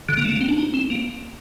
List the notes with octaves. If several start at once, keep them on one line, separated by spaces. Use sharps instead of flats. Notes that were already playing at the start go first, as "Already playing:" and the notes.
D3
A#3
A3
A#3
C4
D4
D#4
C4
A#3